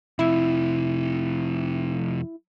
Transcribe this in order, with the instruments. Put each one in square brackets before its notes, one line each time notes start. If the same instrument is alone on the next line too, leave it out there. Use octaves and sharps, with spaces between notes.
[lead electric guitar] F2 C3 [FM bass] E4